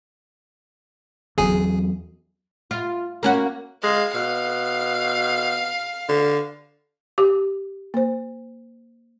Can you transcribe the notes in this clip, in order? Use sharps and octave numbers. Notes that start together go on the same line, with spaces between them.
G1 E2 F#3 G#4 G#5
F4
A#3 C#4 F#4
G#3 F5
B2 F5
D3
G4 D6
A#3 C5